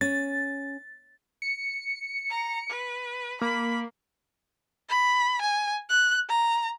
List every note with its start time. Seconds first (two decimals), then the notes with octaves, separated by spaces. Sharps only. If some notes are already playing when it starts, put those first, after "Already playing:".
0.01 C#4 A6
1.42 C#7
2.30 A#5
2.69 B4
3.41 A#3 B5
4.89 B5
5.41 G#5
5.89 F#6
6.30 A#5